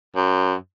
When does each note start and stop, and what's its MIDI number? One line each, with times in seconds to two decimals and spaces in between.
0.15 0.55 42